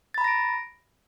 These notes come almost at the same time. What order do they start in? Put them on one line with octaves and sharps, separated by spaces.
A6 B5 A#5 A#6 D7